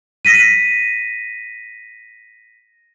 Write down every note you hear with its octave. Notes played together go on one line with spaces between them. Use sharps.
A#6 B6 D#7